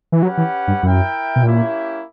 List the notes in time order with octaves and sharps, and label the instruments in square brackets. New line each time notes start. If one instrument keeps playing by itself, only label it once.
[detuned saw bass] E3
[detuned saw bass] F#3 [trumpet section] C#4 G4 B4 F#5
[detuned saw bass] E3
G2
[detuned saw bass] F#2 [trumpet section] E4 A#4 E5 G5
[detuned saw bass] B2
[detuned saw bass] A#2 [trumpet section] A#3 C#4 E4 G4